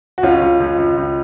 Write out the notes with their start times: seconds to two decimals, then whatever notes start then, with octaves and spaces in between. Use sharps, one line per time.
0.18 F#4
0.23 C#2 C#4 F4
0.42 C#2
0.60 C#2
0.78 C#2
0.97 C#2